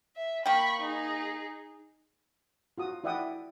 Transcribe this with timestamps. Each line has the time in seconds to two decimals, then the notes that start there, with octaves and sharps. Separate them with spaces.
0.16 E5
0.46 A#3 G5 B5 C#6
0.80 D#4 G#4
2.78 F4 F#4 D#6
3.04 E4 D5 E5 F#5 G5 D#6